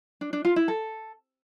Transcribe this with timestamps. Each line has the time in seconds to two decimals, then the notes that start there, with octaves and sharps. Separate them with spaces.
0.21 D4
0.33 D4
0.45 F4
0.56 E4
0.68 A4